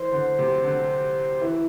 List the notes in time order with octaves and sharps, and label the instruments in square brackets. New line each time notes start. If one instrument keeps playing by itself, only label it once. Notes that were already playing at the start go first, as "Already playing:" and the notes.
Already playing: [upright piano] E3 [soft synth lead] C5
[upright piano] D3
C3
D3
[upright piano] E3 [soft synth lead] E4